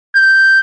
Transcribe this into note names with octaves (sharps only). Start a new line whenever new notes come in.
G6